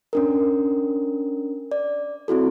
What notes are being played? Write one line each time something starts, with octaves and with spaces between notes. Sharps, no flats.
C#4 D4 A#4
D5
C4 E4 F#4 A4